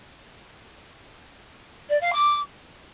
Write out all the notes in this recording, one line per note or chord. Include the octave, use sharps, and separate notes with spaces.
D5
F5
D6